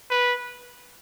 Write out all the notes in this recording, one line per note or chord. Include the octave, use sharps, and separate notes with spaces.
B4